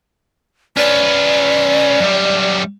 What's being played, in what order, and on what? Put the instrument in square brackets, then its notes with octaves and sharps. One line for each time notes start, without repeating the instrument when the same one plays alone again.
[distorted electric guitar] C#4 B4 [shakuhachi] D5
[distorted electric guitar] F#2 G3